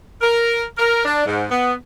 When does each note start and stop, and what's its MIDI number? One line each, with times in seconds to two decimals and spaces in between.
0.21 0.63 70
0.77 1.04 70
1.05 1.24 62
1.25 1.44 44
1.51 1.72 59